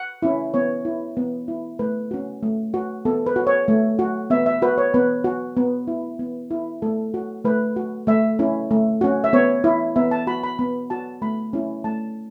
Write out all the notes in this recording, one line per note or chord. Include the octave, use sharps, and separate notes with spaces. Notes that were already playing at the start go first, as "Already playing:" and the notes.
Already playing: F#5
C#4 E4
B3 C#5
E4
B3
E4
A3 B4
C#4 F#4
A3
F#4
B3 A4
B4
F#4
C#5
A3
F#4
B3 E5
E5
F#4 B4
C#5
B3 B4
F#4
B3
E4
B3
E4
A3 A4
F#4
A3 B4
F#4
A3 E5
C#4 E4
A3
C#4 F#4
E5
B3 C#5
E4
B3 E5
A5
F#4 B5
B5
B3 B5
F#4 A5
A3 B5
C#4 E4
A3 A5